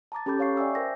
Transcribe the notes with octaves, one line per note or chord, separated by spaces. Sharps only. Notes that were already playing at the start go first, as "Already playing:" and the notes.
A5 A#5 D6 A6
C#4 G4 A4 B5 D6 G6
C#5 F5 C#6 C7
D5 E5 G5 G#5 D6 E6
A#4 C5 E5 G5 G6 A#6